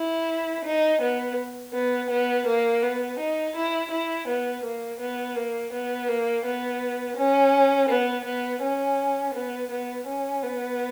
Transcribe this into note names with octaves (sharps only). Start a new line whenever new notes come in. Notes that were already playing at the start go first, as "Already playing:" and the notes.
Already playing: E4
D#4
B3
B3
B3
A#3
B3
D#4
E4
E4
B3
A#3
B3
A#3
B3
A#3
B3
C#4
B3
B3
C#4
B3
B3
C#4
B3